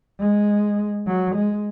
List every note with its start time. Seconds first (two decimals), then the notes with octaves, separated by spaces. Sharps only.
0.20 G#3
1.07 F#3
1.36 G#3